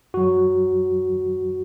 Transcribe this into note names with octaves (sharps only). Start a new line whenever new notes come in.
F#2 F#3 F#4